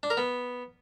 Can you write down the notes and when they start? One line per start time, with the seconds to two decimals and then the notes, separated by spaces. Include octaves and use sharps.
0.03 D4
0.10 A#4
0.17 B3